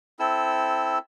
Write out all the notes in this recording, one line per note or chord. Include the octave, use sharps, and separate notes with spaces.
C4 E4 A4 E6